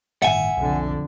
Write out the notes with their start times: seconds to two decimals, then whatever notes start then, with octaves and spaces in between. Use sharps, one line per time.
0.22 G1 A2 D#3 E5 F#5 G#5
0.57 B1 F2 D3